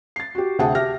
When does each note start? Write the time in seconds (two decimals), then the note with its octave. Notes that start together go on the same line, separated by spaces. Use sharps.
0.16 A6 C7
0.35 F#4 G4
0.59 D2 C3 G#4 F#5 G5 A5
0.75 G4 E5 F6 A#6